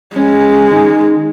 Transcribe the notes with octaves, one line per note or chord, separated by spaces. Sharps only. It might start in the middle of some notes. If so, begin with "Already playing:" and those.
G#3 C#4
D#3